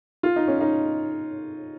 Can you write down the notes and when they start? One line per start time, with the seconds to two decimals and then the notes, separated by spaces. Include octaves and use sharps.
0.23 F4
0.36 D#4
0.48 C#4
0.61 D#4